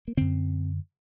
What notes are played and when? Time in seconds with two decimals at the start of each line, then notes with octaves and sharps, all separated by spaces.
0.08 A#3
0.17 F#2 D3 C4